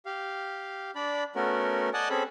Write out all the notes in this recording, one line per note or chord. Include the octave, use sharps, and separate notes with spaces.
G4 F5
D4 D5 B5
A3 B3 C#4 F#4 A#4
D5 D#5 F#5 G#5 A5 D#6
C4 C#4 G#4 A4 B5